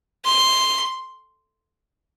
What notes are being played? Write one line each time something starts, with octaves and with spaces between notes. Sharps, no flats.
C6